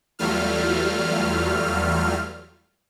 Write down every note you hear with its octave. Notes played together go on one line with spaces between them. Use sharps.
E2 F#3 G3 A3 F4 F6